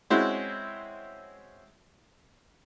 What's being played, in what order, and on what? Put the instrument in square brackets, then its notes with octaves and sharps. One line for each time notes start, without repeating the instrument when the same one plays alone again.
[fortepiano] G#3 C4 C#4 E4 F#4